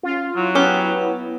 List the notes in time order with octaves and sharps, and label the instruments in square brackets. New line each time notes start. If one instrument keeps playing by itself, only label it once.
[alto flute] C#4 [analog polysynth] F4
[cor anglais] F#3 [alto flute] E4
[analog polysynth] B3 [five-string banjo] C#4 G4